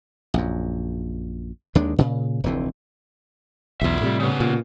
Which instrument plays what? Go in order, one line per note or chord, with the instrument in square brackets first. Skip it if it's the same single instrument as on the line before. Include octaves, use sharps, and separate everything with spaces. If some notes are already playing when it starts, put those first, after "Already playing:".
[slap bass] A#1 F#2
D#2 D#3 G#3 D4
A#2 C#3
F1 D2 E3 C4
[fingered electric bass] B1 E2 [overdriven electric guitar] F4 E5
[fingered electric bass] A2 C3 G3
[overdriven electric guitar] C#3 B3
[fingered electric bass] A#2